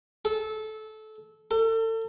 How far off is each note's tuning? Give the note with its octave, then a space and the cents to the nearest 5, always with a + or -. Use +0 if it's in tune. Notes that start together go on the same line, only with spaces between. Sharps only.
A4 -20
A4 +35